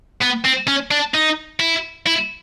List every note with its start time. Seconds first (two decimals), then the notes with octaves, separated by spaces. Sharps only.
0.22 B3
0.45 C4
0.68 C#4
0.91 D4
1.14 D#4
1.60 E4
2.06 E4